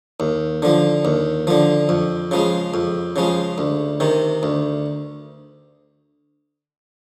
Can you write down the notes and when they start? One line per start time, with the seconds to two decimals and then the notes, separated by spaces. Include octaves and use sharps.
0.20 D#2
0.62 D3 F3
1.05 D#2
1.47 D3 F3
1.89 F2
2.31 C#3 F3 G#3
2.74 F2
3.16 C#3 F3 G#3
3.58 D2
4.00 C3 D#3
4.43 D2